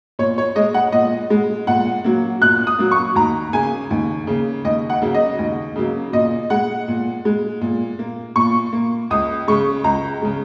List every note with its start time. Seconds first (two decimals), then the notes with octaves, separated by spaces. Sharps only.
0.19 A#2 C#5
0.38 C#5
0.56 G#3 D#5
0.74 F#5
0.92 A#2 D#5
1.30 G#3
1.67 A#2 F#5
2.04 F#3 A#3
2.42 A#2 F#6
2.67 D#6
2.79 F#3 A#3
2.91 C#6
3.15 D#2 A#5
3.53 C#3 A#3 G#5
3.91 D#2
4.27 C#3 A#3
4.65 D#2 D#5
4.90 F#5
5.02 C#3 F#3 A#3
5.14 D#5
5.39 D#2
5.76 C#3 F#3 A#3
6.13 A#2 D#5
6.50 G#3 F#5
6.88 A#2
7.25 G#3
7.61 A#2
7.99 A#3
8.36 A#2 C#6
8.73 A#3
9.11 C#2 D#6
9.48 C#3 G#3 C#6
9.84 C#2 A#5
10.22 C#3 G#3